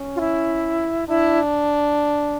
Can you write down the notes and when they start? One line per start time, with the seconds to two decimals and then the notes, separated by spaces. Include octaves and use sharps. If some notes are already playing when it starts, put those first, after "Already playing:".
Already playing: C#4
0.16 F4
0.20 E4
1.08 D4 E4